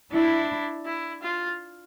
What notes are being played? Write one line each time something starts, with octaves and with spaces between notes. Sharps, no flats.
D4 E4
E4
F4